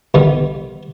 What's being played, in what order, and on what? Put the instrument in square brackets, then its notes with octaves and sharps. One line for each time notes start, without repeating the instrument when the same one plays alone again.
[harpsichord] D3 D#3 G3 B3 F4 G4